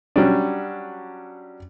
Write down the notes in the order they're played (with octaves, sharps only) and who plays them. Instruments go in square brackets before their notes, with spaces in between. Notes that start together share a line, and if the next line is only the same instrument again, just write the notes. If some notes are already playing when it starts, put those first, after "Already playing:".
[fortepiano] F#3 G3 C#4 D4